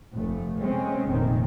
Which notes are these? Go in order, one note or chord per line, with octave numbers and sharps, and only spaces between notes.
F1 A3
G#3 A3 C4 C#4
F1 A#2 D#3 C4